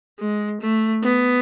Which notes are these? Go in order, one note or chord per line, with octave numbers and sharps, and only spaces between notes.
G#3
A3
B3